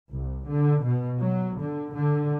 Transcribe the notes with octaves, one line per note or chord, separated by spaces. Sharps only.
C2
D3
B2
F#3
D3
D3